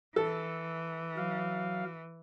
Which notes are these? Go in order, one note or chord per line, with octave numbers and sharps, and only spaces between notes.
E3 A4
F#3 F5